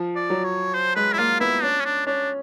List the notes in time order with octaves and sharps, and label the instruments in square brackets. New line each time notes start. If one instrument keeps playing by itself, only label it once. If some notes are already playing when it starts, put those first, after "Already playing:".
Already playing: [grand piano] F3
[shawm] D5
[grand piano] F#3
[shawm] C#5
C5
[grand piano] G#3 [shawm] B4
[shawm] E4
[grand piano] A#3 [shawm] F4
[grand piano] B3 [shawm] E4
[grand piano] C#4 [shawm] D4
[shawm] C#4
D4
[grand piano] C#4 [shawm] D4